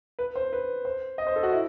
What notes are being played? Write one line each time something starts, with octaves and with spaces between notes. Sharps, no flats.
B4
C5
B4
C5
D#5
C5
A4
F#4
E4